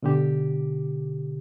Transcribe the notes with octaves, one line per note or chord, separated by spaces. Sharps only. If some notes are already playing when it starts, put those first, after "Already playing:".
B2 D3 G4